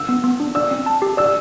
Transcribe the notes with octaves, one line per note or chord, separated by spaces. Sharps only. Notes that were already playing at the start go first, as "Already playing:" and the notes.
Already playing: E6
B3
B3
D4
D5 E6
C4
A5
G4
D5 E6